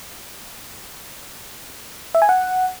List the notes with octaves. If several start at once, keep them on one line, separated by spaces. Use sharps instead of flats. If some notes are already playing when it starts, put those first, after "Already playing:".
E5
G#5
F#5